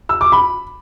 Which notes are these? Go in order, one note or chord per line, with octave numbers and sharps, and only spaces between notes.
E6
D6
B5